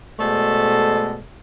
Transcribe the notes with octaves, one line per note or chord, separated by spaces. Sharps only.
B2 G#3 A3 A4 C5 D5